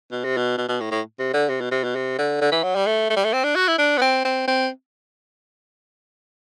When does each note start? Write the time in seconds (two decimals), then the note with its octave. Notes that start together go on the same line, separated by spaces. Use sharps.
0.11 B2
0.24 C3
0.37 B2
0.58 B2
0.68 B2
0.80 A2
0.91 A2
1.19 C3
1.33 D3
1.49 C3
1.61 B2
1.71 C3
1.84 B2
1.95 C3
2.18 D3
2.41 D3
2.52 E3
2.63 F#3
2.75 G3
2.86 A3
3.10 A3
3.16 G3
3.24 A3
3.33 C4
3.44 D4
3.55 F#4
3.68 E4
3.78 D4
3.97 B3
4.01 C4
4.25 C4
4.47 C4